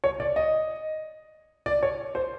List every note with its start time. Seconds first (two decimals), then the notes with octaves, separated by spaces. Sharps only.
0.04 C#5
0.20 D5
0.36 D#5
1.66 D5
1.83 C#5
2.15 C5